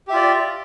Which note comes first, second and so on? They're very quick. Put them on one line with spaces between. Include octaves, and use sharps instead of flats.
G4 E5 F4 D5